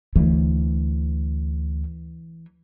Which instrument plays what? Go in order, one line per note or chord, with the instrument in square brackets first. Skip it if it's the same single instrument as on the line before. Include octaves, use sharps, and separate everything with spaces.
[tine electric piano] D2 [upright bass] E3